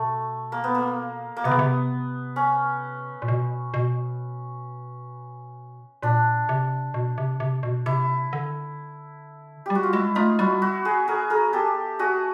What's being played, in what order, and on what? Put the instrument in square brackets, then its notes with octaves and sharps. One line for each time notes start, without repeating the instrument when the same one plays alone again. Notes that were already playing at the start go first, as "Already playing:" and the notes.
Already playing: [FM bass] B2 [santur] A3
[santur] A#3
B3
A#3
A#3
[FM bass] C3 [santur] B3
[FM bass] C#3
C3
[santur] C#4
[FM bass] A#2
B2
B2
[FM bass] A#2 [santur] D4
[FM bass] C3
B2
C3
C3
B2
[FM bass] C3 [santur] E4
[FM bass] D3
[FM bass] G3 [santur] G4
[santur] F#4
F4
[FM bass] G#3 [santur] E4
[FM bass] A3 [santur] D#4 F4
[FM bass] G3 [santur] E4 F#4
[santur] E4 F#4
F#4 G#4
G#4 A#4
G#4 A#4
G4 A4
F#4 G#4